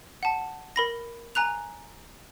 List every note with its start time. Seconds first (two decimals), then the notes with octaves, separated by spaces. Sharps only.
0.23 F#5 A5
0.76 A#4 B5 A#6
1.35 G#5 A#5 F#6 F7